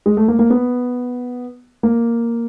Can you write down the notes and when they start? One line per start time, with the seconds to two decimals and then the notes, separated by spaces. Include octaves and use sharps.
0.06 G#3
0.17 A3
0.28 A#3
0.39 A#3
0.50 B3
1.83 A#3